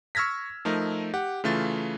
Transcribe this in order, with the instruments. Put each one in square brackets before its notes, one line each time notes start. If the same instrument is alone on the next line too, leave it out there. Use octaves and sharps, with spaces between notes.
[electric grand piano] C#6 E6 F6 G#6 A#6 B6
F3 A3 D#4 A#4
G4 F#5
C#3 E3 A3 F4 A6